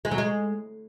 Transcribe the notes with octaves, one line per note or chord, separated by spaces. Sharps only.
G#3
F#3
G#3